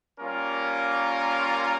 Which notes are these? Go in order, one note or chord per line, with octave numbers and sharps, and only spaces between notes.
G3 A#3 C#4 F4 A#4